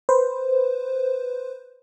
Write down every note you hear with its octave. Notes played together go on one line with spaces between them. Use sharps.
B4 C5